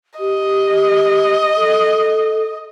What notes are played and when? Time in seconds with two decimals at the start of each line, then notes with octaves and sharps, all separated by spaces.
0.19 G4 D#5
1.56 A4